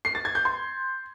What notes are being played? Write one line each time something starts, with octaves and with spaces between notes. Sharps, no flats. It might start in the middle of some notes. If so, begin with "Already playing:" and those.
C7
A6
G#6
G6
C6